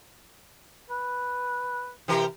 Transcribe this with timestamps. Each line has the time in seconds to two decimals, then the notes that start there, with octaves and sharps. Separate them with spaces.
0.90 B4
2.08 C3 E3 G4 A#4